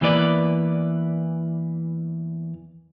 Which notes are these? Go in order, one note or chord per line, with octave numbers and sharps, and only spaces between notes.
E2 E3 A#3 B4 D5